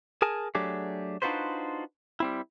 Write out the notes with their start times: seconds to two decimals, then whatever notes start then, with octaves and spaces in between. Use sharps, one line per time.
0.22 G#4 A#4 G#5 A5
0.55 F#3 A3 D4 G4 G#4
1.22 D4 D#4 F4 F#4 B4 C5
2.20 G3 C4 E4